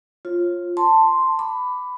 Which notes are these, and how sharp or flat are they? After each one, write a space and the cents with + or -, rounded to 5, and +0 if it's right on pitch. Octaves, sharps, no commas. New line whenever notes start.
F4 +0 C#5 -40
A5 +10 C6 +0
B5 +15 D6 +0